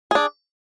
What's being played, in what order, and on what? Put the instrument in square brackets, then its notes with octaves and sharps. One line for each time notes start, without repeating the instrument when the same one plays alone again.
[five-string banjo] D4 G#4